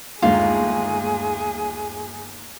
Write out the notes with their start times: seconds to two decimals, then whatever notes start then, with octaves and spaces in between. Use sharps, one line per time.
0.22 G1 D#2 G#3 F4 G#4